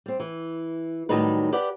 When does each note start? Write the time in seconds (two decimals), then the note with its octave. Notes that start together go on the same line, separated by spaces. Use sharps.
0.06 G3 C4
0.20 E3
1.09 A2 D#3 F#3 G3 D#4 B4
1.52 G4 B4 D5 F#5